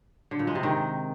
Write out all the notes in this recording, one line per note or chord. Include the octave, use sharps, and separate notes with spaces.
D3
A#2
G#3
C3
D#3